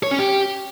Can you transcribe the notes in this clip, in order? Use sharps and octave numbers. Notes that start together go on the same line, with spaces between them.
C#5
C#4
G4